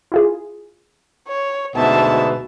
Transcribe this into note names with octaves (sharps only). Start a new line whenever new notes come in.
E4 F4 G#4
C#5
D2 G#2 B2 E5 A5